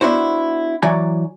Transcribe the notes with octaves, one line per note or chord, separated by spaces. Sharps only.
B3 D4 E4 F#4 C5
E3 F#3 F#4 D5 G#5 A#5